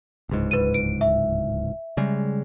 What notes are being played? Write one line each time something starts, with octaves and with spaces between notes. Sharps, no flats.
D1 C#2 G#2
B4 D#7
D7
E5
C#3 G3 G#3